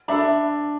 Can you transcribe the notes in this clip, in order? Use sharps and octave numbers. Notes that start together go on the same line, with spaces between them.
D4 A4 E5 B5
D4